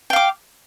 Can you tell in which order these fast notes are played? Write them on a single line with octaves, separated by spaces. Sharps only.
G5 F5 D6